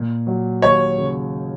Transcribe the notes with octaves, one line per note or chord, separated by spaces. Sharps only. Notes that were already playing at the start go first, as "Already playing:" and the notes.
Already playing: A#2
F#3
D#2 C#5
C#3